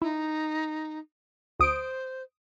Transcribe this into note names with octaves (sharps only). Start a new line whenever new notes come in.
D#4 E4
D2 C5 D#6 D7